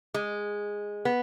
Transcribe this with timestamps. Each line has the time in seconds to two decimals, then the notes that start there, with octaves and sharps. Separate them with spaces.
0.14 G#3
1.05 B3